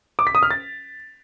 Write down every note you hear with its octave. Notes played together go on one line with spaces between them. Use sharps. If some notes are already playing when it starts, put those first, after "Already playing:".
D6
B6
D#6
F6
A6